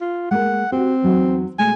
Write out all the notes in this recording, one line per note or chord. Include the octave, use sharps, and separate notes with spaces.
F4
G#3 A#3 A#4 F#5
C4 F#4 G4
E2 F#3 D#4
B2 G#3 A3 G#5